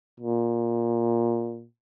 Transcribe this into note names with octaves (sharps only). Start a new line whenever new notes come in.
A#2